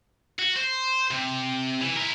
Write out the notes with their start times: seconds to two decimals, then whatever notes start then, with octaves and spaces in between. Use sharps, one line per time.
0.39 F#4
0.56 C5
1.11 C3
1.81 E3
1.97 E4 A#4